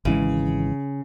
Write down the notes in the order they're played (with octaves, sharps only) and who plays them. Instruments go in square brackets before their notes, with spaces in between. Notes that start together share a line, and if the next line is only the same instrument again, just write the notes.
[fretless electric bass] G#1 E3 G#3 [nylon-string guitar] C#3